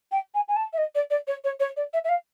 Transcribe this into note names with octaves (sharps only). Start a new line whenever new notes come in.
G5
G#5
G#5
A5
E5
D#5
D5
D5
C#5
C#5
C#5
D5
E5
E5
F5